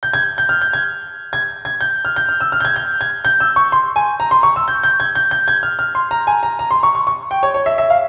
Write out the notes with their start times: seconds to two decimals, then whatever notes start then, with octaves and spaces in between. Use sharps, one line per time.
0.03 G6
0.13 G#6
0.38 G6
0.49 F6
0.61 G6
0.73 G#6
1.33 G#6
1.65 G#6
1.81 G6
2.05 F6
2.16 G6
2.29 F6
2.40 E6
2.52 F6
2.60 G6
2.65 G#6
2.76 G6
3.01 G#6
3.25 G6
3.40 E6
3.56 C#6
3.72 C6
3.96 G#5
4.20 A#5
4.31 C6
4.43 C#6
4.56 E6
4.68 G6
4.83 G6
5.00 G#6
5.15 G6
5.31 G6
5.48 G#6
5.63 F6
5.79 F6
5.95 C6
6.11 A#5
6.27 G#5
6.43 A#5
6.59 A#5
6.71 C6
6.83 C#6
6.95 C#6
7.07 C#6
7.31 G5
7.43 C#5
7.54 C#5
7.66 E5
7.78 E5
7.90 F5